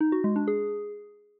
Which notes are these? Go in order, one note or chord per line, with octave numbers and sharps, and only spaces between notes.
D#4
F#4
G#3
D4
G#4